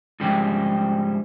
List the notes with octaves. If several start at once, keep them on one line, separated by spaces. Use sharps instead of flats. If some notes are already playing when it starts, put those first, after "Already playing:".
G#2 C#3 F3 G3 C4 G4